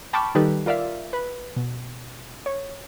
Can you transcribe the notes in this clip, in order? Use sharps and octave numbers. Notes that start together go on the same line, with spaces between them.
G5 A5 B5 C#6 D6 F6
D#3 G3 D#4 G4 A4 B4
F4 A#4 D5 E5 F5
B4
B2
C#5